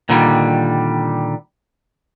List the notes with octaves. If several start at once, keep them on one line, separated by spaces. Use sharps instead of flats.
A#2 D3 D#3 G3